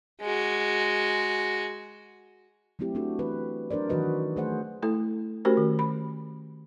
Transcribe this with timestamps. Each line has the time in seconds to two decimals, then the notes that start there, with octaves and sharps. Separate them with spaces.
0.21 G#3 F#4
2.79 F#3 A3 C4 E4 G4
2.95 A3 C4 D4 F#4 A4
3.19 E3 B4
3.71 F#3 D4 A#4 C5 D5
3.89 D#3 E3 F#3 F#4 B4 D#5
4.36 F#3 A3 G#4 C5 F#5
4.82 A3 E4 A4
5.45 A3 C#4 F#4 G4 A#4 C5
5.57 D#3
5.79 B5